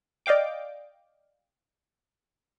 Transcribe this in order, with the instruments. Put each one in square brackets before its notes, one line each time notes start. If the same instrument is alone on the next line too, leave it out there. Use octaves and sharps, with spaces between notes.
[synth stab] D5 D#5 F5 G5 D6